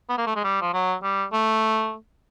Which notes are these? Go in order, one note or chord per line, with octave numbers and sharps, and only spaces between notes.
B3
A#3
A3
G#3
G3
F3
F#3
G3
A3